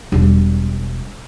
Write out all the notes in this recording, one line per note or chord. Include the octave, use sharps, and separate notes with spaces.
E1 G3